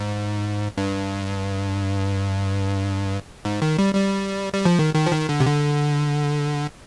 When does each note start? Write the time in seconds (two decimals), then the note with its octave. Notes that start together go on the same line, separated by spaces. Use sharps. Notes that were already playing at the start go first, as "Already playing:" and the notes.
Already playing: G#2
0.77 G2
3.45 G#2
3.62 D#3
3.79 G3
3.95 G3
4.53 G3
4.65 F3
4.79 D#3
4.95 D#3
5.06 F3
5.12 D#3
5.29 D3
5.40 C3
5.46 D3